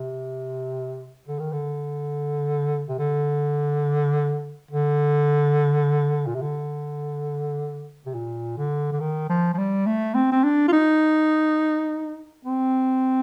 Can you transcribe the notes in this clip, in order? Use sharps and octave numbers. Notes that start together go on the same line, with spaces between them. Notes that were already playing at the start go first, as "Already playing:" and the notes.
Already playing: C3
D3
D#3
D3
C3
D3
D3
A#2
C3
D3
C3
A#2
D3
D3
D#3
F3
F3
G3
A3
C4
C4
D4
F4
D#4
C4